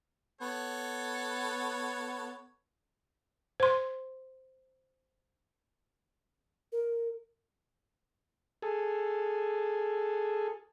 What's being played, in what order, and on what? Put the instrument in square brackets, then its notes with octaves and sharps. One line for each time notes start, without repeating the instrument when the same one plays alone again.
[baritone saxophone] B3 [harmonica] A4 C#5
[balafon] C5 C6
[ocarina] A#4
[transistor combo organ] G#4 A4